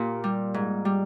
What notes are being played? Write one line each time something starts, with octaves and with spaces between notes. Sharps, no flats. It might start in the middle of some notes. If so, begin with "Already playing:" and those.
Already playing: A#2 F4 G4
G3
G#2
G3